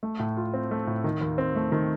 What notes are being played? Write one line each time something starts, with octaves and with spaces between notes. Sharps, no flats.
A3
A2
F4
C4
A3
A2
D#3
D#2
C4
A3
D#3